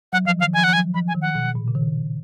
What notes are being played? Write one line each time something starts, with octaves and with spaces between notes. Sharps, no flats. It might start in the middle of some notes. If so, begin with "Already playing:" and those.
F#3 F#5
F3 F5
D#3 F5
F3 G#5
F3 F#5
F#3 G#5
F3 B5
G#5
D#3
F#5
B2
A#2
C#3
D#3